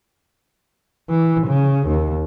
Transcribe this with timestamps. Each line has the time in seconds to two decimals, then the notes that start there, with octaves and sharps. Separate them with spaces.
1.10 E3
1.47 C#3
1.88 D#2